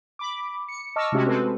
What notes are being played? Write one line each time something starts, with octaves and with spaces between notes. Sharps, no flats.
B5 D6
C#7
D#5 A5 C#6 D6 E6 F6
C3 G#3 A3 C#4 F#4 G4
G#3 C4 F#4 A4 B4